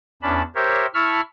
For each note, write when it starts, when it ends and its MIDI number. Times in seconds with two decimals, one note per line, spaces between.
0.22 0.42 40
0.22 0.42 61
0.22 0.42 62
0.22 0.42 81
0.22 0.42 83
0.55 0.86 67
0.55 0.86 70
0.55 0.86 72
0.55 0.86 73
0.55 0.86 76
0.94 1.21 64
0.94 1.21 81
0.94 1.21 83
0.94 1.21 85
0.94 1.21 88
0.94 1.21 89